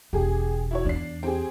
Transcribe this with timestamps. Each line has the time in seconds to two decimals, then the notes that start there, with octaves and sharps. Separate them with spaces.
0.13 E1 G4 G#4
0.71 E4 F#4 C#5
0.85 E2 D4 C7
1.23 C4 G4 G#4